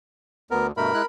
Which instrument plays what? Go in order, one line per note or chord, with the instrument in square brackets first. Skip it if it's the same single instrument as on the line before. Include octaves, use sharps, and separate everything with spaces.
[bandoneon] D2 [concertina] B3 A#4
[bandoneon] G2 B2 A3 [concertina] A#4 B5
[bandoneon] G#3 E4 F#6